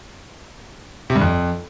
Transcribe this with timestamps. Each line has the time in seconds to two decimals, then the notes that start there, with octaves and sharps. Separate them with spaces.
1.10 C3
1.15 G2
1.21 F2